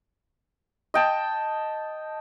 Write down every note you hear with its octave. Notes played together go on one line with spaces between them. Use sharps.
D#5 G5 A5